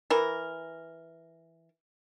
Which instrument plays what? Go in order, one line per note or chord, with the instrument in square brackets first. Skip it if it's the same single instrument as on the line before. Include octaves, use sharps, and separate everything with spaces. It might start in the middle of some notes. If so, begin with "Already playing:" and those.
[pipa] E3 A#4